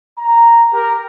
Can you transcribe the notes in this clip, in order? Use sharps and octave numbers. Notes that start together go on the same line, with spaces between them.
A#5
G4 A#4